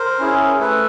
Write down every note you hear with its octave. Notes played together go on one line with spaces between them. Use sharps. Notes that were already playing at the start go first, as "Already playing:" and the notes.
Already playing: A#4 C5
C#4 E4 G#4
A3 A4 B4